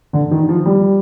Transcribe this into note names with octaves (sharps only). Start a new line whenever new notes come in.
D3
D#3
F3
G3